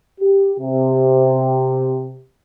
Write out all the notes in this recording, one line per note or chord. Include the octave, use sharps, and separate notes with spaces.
G4
C3